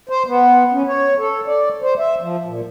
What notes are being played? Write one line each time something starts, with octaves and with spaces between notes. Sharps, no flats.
C5
B3
C#4
C#5
A4
D5
C5
E5
F3
A#2